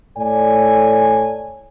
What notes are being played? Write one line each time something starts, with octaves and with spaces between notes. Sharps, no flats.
A2 A4 C#5 D5 G#5